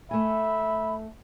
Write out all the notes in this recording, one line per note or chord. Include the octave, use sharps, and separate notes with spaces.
A3 E5 G#5 B5